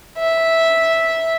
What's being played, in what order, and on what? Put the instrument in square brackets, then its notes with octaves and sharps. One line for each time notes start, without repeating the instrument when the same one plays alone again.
[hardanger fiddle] E5